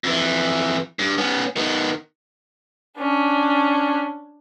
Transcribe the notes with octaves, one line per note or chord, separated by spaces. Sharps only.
F2 E3
G2
B3 C#4
D#3 B3
C#4 D4